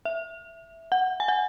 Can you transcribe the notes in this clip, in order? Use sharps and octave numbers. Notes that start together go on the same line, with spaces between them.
E5
F#5
G#5
F#5